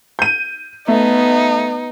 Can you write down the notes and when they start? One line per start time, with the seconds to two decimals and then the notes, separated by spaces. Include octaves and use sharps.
0.19 G6 D#7
0.88 A3 B3 D#4